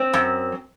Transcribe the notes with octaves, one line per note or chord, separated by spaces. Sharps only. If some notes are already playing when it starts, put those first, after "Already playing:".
Already playing: C4
F#2